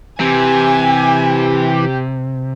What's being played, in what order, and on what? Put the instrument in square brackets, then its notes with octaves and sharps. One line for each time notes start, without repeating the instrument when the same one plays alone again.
[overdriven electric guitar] C3 [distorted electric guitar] E3 [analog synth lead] G4 [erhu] G#5